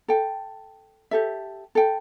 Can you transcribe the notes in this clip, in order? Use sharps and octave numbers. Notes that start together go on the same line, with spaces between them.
A4 G5
G4 A4 E5
A4 G5